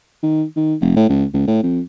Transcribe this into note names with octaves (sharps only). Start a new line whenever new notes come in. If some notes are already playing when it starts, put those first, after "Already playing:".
D#3
D#3
F1
A2
C#2
C#2
A2
F2